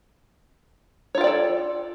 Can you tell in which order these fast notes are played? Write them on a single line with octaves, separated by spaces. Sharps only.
C#5 F4 G5 D5 A4